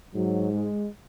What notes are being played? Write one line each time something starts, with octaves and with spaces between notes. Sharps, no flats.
G#2 F#3
G#3